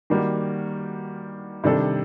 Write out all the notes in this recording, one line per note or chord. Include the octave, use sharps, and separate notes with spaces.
D#3 G3 A#3 F#4
C3 D#3 G3 D4 A4